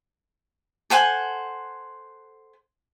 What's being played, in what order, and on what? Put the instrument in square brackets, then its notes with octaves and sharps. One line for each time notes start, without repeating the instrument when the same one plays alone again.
[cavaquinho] A4 C5 F#5 G#5